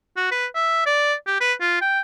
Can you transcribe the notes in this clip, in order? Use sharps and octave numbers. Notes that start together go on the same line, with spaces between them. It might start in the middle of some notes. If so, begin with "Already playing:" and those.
F#4
B4
E5
D5
G4
B4
F4
G5